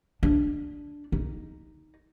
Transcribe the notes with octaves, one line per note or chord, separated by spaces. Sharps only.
D4
D#4